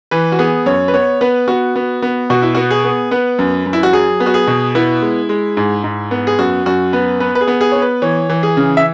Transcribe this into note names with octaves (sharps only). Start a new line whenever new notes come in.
E3 B4
F#4
B3 G#4
F#2 C#5
B4
B3 C#5
B3 B4
B3 F#4
B3
B3
B2 F#4
E4
B3 F#4
G#4
B3
B3 B4
F#2
F#2
E4
F#4
F#3 G#4
B3
F#4
G#4
B2
B3 E4
G#3
G#3
G#2
G#2
B3
G#4
F#2 F#4
F#2 F#4
B3 B4
B3 B4
B4
G#4
B3
G#4
B3 C#5
B4
E3 C#5
E3
G#4
C#3
E5